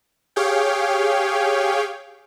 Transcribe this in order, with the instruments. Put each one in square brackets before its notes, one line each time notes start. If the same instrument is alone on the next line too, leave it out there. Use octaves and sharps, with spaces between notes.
[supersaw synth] G4 G#4 C#5 F5 G5